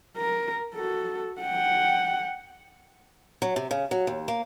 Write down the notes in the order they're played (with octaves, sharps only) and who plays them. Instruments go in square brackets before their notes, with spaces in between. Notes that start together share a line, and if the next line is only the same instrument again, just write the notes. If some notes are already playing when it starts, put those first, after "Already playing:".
[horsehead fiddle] A#4
F#4 A4
F#5 G5
[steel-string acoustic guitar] F#3
C3
C#3
F#3
D#2
A#3